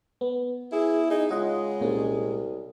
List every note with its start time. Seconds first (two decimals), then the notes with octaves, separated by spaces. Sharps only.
0.21 B3
0.72 E4 G#4
1.10 D#4 G#4
1.30 C#3 G#3 F4 D#5 F#5
1.81 C2 A#2 C#4